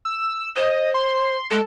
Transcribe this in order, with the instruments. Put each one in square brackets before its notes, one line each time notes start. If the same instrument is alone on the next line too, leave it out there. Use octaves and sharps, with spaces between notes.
[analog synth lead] E6
[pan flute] C5 [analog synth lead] D#5
[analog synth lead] C6
[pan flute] G#3 [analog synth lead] A4